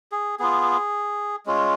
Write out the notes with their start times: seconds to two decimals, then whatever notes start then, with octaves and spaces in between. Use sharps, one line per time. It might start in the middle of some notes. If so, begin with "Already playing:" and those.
0.12 G#4
0.39 B3 F4 G#4
1.46 G#3 C#4 F4